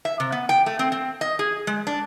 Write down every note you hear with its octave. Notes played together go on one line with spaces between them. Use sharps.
E5
C3
B3
G5
A3
C4
C4
D#5
G#4
G#3
D4